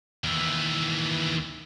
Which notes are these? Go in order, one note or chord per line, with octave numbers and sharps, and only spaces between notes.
D#2 E3